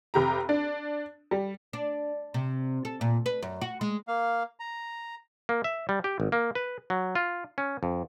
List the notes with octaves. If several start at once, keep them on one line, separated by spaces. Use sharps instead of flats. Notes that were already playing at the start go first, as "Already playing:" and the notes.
F1 G4 A#5
D4
G3
D4
C3
A4
A#2
B4
F#2
F#4
G#3
A#3 F5
A#5
A#3
E5
G3
G4
G#1
A#3
B4
F#3
F4
C#4
F2